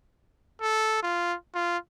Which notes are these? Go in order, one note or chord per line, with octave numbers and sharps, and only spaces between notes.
A4
F4
F4